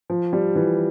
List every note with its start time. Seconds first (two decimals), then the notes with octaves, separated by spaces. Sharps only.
0.10 F3
0.33 G3
0.56 E3